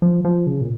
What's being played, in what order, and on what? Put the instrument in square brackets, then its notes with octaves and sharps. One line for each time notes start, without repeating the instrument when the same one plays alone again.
[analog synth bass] F3
F3
C#3
A#2